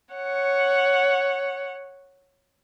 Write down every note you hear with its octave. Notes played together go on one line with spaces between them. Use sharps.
C#5 F#5